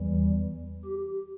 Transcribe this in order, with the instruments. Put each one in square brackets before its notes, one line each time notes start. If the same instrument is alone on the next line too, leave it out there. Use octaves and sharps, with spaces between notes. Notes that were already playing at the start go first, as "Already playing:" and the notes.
Already playing: [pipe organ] E2 E3 G3
G4